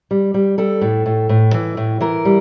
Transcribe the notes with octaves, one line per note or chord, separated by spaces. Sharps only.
G3
G3
G3 A4
A2
A2
A2
E3
A2
E3 A#4
G3